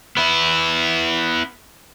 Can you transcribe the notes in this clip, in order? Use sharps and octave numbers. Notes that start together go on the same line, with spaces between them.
B3 E4